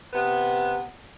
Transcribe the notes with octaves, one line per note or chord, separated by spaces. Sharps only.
C3 B3